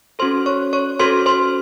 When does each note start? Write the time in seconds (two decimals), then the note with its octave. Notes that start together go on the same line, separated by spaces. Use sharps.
0.19 C#4 F#4 A4 C5 C6
0.46 C#5 C#6
0.73 C#5 C#6
0.99 C#4 F#4 A4 C5 C6
1.26 C5 C6